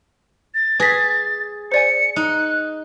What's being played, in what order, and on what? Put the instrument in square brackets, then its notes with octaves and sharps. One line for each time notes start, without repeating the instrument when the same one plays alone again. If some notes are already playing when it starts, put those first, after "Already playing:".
[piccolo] A6
[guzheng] G#4 [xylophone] B4 A#6 B6
[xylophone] C5 D5 G#5 [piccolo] C#7
[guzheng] D#4 [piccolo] F#6